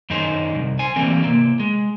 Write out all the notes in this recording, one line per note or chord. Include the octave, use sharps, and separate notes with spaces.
F#2 D#3 D#4 G#4 C5
C2
C5 G#5
E3 G3 A3 A#3 C4
C3 A#3 C4
G#3